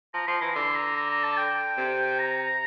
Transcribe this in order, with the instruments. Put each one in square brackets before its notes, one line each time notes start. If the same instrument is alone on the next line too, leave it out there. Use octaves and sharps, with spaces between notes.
[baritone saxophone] F3 [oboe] A#5
[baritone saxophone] F3 [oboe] C6
[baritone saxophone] E3 [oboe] A#5
[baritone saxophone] D3 [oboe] C6
[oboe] A#5
A#5
A#5
A5
G5
[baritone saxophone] C3
[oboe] A#5